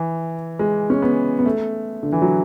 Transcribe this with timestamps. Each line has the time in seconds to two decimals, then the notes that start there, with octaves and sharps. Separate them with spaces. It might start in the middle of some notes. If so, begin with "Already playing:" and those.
Already playing: E3
0.59 G#3
0.90 C#4
1.02 B3
1.39 B3
1.45 A3
2.03 D3
2.12 E3
2.22 F#3